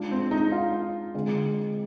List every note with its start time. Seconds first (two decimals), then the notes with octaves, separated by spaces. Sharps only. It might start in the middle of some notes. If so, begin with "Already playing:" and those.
Already playing: G#3 D4 F4 G#4
0.11 C4
0.31 D#4
0.52 F4
1.14 D3 G#3 C4